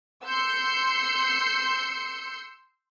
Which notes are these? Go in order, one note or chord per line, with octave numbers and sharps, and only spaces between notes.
C6 E6 G6 C7 C#7